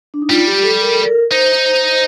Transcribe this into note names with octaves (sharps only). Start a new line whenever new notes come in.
D4
D#4
G3 F4
G4
A4
A#4
A4
A#4
D#4 C5